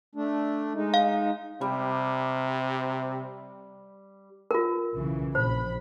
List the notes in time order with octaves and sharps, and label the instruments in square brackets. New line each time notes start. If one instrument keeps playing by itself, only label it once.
[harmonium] A3 D4
G#3 D#4
[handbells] F5
[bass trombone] C3 [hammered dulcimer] G3
[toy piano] F4 A#4
[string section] B1 C#3 E3
[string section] A#1 B5 [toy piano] C5